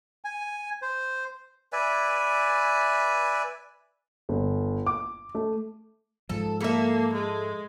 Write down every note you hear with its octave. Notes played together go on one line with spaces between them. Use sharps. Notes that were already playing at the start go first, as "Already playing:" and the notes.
G#5
C5
B4 D5 E5 G#5
G1
D6
A3
G#2 F3 A4
A#3 A4 E5
G#3